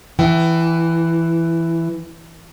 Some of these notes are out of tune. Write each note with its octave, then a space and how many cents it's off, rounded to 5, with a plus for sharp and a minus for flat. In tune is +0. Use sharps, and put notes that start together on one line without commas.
E3 +10 G5 -35